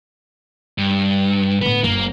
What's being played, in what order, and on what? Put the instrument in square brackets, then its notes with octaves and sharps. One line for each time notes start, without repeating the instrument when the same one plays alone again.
[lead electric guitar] G2
[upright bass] A2 D3 [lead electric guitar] B3 B4
[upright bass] F#1 [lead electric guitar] A#3